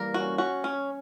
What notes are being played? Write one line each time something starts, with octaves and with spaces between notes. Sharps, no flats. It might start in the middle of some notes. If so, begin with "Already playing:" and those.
Already playing: E3 G3 A#3 A#4
F#4
C#4
C#4 F#4
C#4